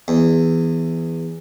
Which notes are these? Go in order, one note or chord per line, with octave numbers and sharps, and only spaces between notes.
E2